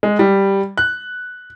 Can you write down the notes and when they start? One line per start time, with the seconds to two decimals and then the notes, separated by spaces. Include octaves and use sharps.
0.03 G#3
0.19 G3
0.77 F#6